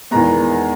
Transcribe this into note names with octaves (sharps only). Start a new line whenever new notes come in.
E2 D#3 G#3 B3 A#5